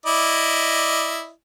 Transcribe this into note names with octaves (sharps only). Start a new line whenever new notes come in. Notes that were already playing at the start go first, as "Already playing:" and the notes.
E4 D5 D#5